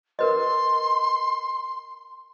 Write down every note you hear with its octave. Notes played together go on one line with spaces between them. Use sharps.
A#4 B4 D#5 C6